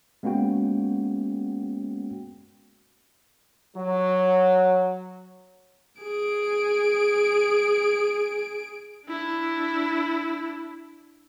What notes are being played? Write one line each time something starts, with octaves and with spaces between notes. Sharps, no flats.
G#3 A#3 B3 C#4 F#4 G5
F#3
G#4 D7
D4 E4